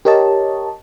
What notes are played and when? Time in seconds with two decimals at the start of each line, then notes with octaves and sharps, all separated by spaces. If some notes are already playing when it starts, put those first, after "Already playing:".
0.05 G4 A#4 C#5 D#5 A5